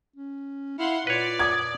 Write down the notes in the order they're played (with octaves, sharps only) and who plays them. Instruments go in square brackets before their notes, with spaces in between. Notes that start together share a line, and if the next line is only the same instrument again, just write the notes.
[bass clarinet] C#4
[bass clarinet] E4 [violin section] F5 F#5 C6
[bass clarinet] A#2 [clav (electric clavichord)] B4 C#5 [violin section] D5
[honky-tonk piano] D6 D#6 G#6